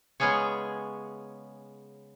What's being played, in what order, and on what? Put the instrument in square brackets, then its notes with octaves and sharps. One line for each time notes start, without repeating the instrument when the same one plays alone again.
[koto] C#3 G#3 B3 C#4 G#4 C#5